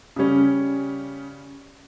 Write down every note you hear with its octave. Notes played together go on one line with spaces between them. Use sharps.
C#3 G3 C#4